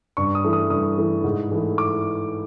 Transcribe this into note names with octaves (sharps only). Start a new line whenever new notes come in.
G2 C#6
D#6
E3 A3
D#6
G2 D#6
E3 A3
G#2
E3 A3
D6